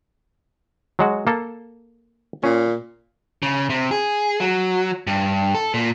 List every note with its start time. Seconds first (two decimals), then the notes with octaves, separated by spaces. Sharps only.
0.99 F#3 G#3 F#4
1.27 A#3 A4
2.44 A#2 C#4
3.43 C#3
3.70 C3
3.91 G#4
4.40 F#3
5.07 G2
5.55 A4
5.74 A#2